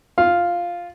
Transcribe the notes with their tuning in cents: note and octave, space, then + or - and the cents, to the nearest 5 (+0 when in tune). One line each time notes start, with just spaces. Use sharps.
F4 +0 F5 +0